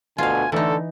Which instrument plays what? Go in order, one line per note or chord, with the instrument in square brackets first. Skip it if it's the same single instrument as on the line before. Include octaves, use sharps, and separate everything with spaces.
[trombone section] D2 B2 D3 [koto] F4 F5 [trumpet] G#5
[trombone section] D3 A3 [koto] E3 D#4 [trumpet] A4